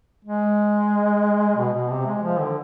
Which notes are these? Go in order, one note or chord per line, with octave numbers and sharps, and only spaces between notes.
G#3
B2
B2
C3
G#3
F3
D3